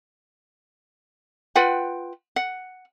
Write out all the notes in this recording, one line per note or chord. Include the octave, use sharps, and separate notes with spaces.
F4 B4 F#5 G5
F#5